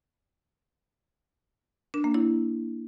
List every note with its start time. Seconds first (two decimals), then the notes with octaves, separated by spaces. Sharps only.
1.94 D4
2.04 A#3
2.14 E4